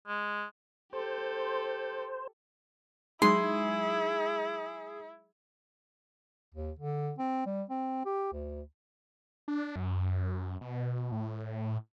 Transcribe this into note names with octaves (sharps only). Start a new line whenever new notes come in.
G#3
G4 A4 C5
F#3 G#3 D#4 E4 G#4 C6
D#2
D3
C4
G3
C4
G4
D2
D4
F#2
B2
A2